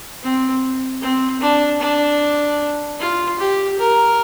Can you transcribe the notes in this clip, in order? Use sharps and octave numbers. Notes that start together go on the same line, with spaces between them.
C4
C4
D4
D4
F4
G4
A#4